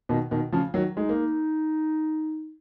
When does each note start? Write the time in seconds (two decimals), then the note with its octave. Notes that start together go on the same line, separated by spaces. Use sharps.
0.09 B2 D#3
0.31 B2 D#3
0.52 C#3 F3
0.74 D#3 F#3
0.96 G#3 D#4
1.09 A#3